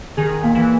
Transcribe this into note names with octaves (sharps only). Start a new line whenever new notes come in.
D#3 G#4
A#2
E3